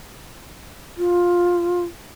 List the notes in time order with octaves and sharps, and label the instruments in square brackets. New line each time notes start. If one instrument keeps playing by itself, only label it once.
[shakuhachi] F4